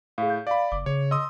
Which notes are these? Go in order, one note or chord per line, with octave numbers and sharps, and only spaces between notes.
A2 G#4 F5
G6
D5 F5 B5 D6
F#1 D6
C#3 C#5
D#5 C6 D#6 E6